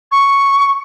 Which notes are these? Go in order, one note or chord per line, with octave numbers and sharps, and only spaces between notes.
C#6